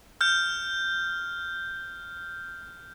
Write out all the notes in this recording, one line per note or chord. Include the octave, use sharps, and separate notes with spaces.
F6 G6